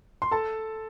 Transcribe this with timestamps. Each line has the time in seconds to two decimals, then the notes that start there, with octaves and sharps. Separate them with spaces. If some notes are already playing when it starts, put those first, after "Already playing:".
0.22 C6
0.31 A4 A5